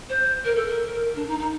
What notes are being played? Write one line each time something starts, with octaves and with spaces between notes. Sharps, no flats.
C5
A#4
A4
A#4
D4
D#4
D#4